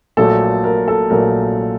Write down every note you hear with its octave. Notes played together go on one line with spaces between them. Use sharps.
A#1 A#2 F#3 A3 A4
A#4
A4
A#1 A#2 F#3 A3 A#4